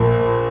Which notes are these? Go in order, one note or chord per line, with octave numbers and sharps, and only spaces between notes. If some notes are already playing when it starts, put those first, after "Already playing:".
Already playing: A#1 A#2